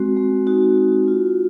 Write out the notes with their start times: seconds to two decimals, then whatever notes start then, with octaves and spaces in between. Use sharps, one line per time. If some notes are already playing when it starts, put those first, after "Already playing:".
Already playing: G#3 C4 F#4
0.17 G#3
0.47 D#4 F#4
0.78 F#4
1.08 F4